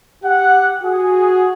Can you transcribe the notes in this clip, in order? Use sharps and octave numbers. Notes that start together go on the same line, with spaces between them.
G4 F#5
F#4 G#4